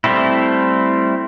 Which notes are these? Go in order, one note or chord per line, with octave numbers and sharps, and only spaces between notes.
G3 A3 C4 E4